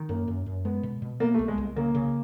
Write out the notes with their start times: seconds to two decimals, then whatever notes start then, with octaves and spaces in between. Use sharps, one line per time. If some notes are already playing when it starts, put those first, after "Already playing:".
Already playing: D#3
0.09 F#2 A#3
0.28 F#2
0.46 F#2
0.65 G#3 B3
0.83 B2
1.02 B2
1.20 A#3 B3
1.34 A3
1.39 C2
1.48 G#3
1.58 C2
1.76 C#3 A#3
1.95 C#3